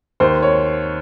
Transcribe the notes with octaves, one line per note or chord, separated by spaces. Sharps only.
D#2 C5
C#5